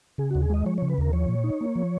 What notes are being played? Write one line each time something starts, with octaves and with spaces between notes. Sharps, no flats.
C#3 G#4
D#2 F#4
G#4
G#3 D#5
F3 C#5
C#3 C#5
B4
D#2 A#4
F3 C#5
A#2
D#4
A#3
F3